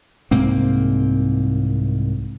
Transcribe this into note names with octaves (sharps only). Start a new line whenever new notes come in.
C2 G#2 A#3 C4